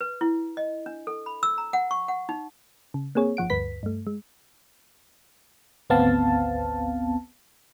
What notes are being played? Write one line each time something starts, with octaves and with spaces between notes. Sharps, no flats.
B4
E4
D#5
D4
A4
B5
E6
A#5
F#5
C#6
F#5
D#4
C#3
A#3 C4 G#4 C#5
G1 F3 F#5 D7
D2 G2 B4 B6
G2 A3
G#3
G#1 D2 B3 C4 F5 A5